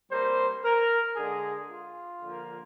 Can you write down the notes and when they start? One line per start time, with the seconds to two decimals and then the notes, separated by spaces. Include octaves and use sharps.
0.11 C3 G3 A#3 C5
0.64 A#4
1.16 D3 G#3 G#4
1.69 F4
2.21 D3 F3 A#3